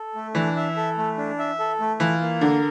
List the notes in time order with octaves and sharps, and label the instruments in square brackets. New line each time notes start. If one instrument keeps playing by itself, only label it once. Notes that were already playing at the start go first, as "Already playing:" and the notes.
Already playing: [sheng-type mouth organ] A4
A3
[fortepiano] E3 [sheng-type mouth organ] D4
[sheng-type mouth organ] E5
A4
A3
D4
E5
A4
A3
[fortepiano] E3 [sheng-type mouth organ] F4
[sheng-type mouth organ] A#3
[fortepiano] D3 [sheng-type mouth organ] A#4